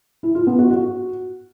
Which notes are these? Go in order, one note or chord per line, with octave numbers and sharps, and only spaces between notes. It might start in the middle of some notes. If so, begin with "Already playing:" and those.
E4
F4
B3
F#4
F#4